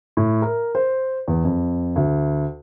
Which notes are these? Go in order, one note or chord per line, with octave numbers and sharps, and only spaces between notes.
A2
A#4
C5
E2
F2
D2